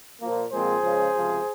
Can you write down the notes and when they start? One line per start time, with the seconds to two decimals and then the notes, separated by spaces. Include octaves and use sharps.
0.21 A#2 F3 A#3
0.52 A#2 F3 G#3 C4 G#4 C5
0.83 C#2 C#3 F3 G#3
1.14 C#2 C3 F3